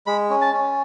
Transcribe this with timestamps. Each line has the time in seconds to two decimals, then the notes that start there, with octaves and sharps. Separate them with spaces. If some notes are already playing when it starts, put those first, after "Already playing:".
0.07 G#3 B5
0.30 C#4
0.41 A5
0.54 C#4